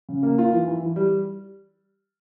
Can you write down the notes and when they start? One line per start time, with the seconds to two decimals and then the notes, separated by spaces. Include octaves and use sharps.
0.09 C#3
0.23 A#3
0.38 F4
0.53 E3
0.68 E3
0.82 E3
0.96 G3